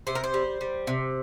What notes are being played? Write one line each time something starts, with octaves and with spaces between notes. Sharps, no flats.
C3 C5
A#4
C5
G3
G3
C3